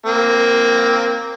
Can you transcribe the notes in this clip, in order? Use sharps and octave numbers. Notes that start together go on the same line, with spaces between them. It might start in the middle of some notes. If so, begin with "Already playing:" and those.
A#3 C4